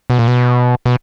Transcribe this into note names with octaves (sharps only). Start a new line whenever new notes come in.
B2
A#2
B2
B2